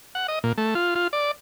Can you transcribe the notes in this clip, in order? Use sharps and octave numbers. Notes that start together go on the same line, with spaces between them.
F#5
D#5
A#2
A3
F4
F4
D5